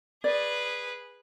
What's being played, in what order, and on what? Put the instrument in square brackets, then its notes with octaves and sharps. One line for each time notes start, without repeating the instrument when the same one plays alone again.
[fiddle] G#4 B4 [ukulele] D5